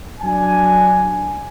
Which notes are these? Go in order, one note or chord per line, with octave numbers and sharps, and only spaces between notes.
F#3 D4 G#5